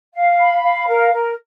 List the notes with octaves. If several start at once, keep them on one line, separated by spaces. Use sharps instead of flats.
F5
B5
F5
A#4
A#4